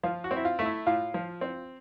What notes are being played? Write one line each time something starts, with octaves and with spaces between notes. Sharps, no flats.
F3 F4
F#4
C4
E4
F4
A3
E4
A2 F4
F3
C4